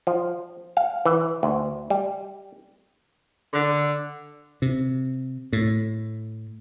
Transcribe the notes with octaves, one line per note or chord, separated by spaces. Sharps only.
F3
F5
E3
D2
G3
D3
C3
A2